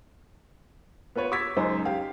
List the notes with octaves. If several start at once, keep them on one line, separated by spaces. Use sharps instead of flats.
B3 F4 B4 C#5
C#6 D6 E6 G#6 A6 B6
C#2 F#2 D#4 C5
G4 F5